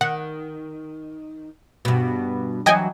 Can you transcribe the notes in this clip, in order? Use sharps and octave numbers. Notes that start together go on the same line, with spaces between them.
D#3 F#5
G2 B2
E3 F#3 C#5 D#5 G5 G#5